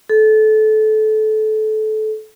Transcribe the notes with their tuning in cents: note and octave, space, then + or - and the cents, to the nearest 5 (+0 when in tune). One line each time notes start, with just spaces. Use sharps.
A4 -25